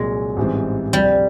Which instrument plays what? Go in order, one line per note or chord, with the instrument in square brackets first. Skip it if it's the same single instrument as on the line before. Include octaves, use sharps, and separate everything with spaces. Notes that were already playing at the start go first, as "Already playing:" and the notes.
Already playing: [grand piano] C2 A#2 F#3 [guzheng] G#3
[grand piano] A1 G#2 E3 G3 C4
[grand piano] D2 C3 F3 [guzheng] G3